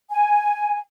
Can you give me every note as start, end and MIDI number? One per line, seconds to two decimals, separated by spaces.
0.11 0.79 80